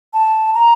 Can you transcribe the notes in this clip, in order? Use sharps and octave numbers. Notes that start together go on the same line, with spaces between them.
A5
A#5